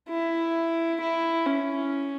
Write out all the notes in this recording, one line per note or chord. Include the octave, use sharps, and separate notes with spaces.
E4
E4
C#4